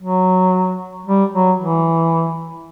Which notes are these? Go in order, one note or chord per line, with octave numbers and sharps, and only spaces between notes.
F#3
G3
F#3
E3